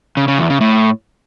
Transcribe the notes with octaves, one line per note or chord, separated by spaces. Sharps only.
C#3
C#3
E2
C#3
A2